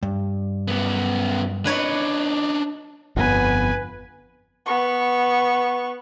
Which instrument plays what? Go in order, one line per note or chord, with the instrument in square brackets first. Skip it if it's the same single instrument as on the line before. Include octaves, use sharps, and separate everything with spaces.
[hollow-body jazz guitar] G2
[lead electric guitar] F#2 B3
[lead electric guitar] D4 D#4 [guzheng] B4 C#5 B5
[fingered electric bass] G1 F2 B3 [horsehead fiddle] B4 G#5
[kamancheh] B3 C#6